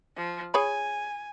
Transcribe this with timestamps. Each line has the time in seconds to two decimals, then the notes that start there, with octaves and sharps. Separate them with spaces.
0.16 F3
0.54 G#4 C#5 G#5 B5